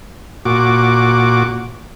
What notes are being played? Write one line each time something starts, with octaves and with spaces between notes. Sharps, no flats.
A#2 F#4 D6